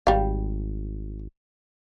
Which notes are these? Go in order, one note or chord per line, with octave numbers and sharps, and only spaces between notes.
G#1 G3 F5